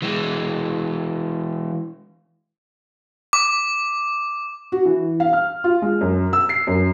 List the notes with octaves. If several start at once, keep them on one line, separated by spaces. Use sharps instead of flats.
E3 G#3
D6
F#4
E3
F5
F6
F4
G#3
F#2
E6
C7
F#2